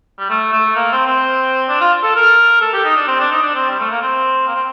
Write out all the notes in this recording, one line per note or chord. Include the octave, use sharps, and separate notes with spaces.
G3
A3
A3
A#3
C4
C4
D4
F4
A4
A#4
A4
G4
D#4
D4
C4
D4
D#4
D4
C4
G3
A3
A#3
C4
A#3
C4